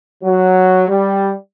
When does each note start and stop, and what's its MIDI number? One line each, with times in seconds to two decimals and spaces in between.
0.23 0.85 54
0.89 1.32 55